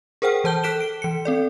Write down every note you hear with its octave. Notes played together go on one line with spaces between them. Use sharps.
G#4 A#4 C5 F#5 G5 F6
E3 C5 A5 G6 G7
A4 F#6 B6 D7 E7 G7
D7
E3 C#7
C4 A4 D5